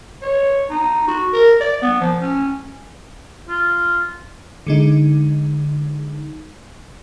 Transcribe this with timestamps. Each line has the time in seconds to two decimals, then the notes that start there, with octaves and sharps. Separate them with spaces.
0.22 C#5
0.70 D#4
1.07 F#4
1.33 A#4
1.60 D5
1.82 B3
2.00 F3
2.21 C#4
3.48 F4
4.67 D3 G#3 D#4